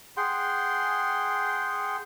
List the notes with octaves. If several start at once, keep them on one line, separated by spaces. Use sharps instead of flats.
G#4 F#5 G5 C6